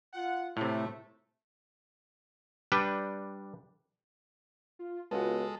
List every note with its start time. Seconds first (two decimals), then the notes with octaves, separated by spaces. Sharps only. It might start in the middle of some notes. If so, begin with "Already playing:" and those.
0.14 F4 F#5
0.57 A2 C3 A3
2.72 G3 D4 B4 G5
4.79 F4
5.11 C#2 G#3 B3 F4 F#4 A4